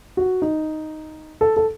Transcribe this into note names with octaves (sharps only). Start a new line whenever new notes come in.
F#4
D#4
A4
A4